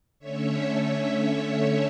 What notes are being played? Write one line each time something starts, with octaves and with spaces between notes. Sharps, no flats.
D3 A3 C#4 C#5 E5